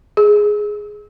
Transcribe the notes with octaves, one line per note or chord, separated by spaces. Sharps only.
G#4